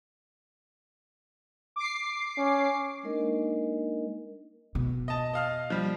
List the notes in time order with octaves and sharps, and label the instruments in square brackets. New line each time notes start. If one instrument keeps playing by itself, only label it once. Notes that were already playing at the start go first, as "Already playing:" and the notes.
[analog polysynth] D6 C7
[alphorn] C#4
[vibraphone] G#3 A#3 D4 D#4 A#4 D#5
[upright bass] B2
[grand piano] D#5 A5
D#5 F5 F6
F3 G3